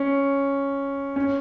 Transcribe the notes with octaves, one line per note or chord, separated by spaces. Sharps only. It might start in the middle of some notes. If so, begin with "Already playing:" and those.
Already playing: C#4
C#4